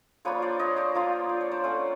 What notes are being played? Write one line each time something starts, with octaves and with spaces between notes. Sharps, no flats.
F3 A#3 D4 F4 B4 C#5
C5 D5
C#5 D#5
C5 D5
F3 A#3 D4 F4
D5
C#5
C5 D5
A3 C#4 F4 F#5 G#5